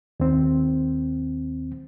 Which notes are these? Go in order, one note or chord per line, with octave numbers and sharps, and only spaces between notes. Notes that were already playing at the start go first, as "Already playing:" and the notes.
D#2 C4